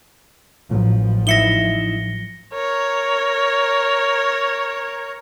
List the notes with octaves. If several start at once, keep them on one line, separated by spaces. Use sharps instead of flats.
A1 A2 F3 F#3
D#4 E4 E5 A#6 C#7 G7
A#4 C#5